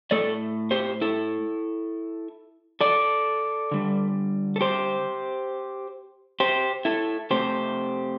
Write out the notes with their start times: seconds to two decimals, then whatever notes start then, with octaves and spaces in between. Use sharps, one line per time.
0.11 A2 A3 A4 D5
0.71 G4 C5
1.02 E4 A4
2.81 A4 D5
3.71 D3 G3
4.56 A4
4.61 G4 C5
6.40 G4 C5
6.85 E4 A4
7.30 C3 A3 G4 C5